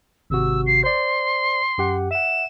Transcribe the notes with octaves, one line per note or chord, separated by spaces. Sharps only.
G#1 C3 F#4 E6
C7
C5 D5 C6
F#2 G4 F#5
E5 F#5 E7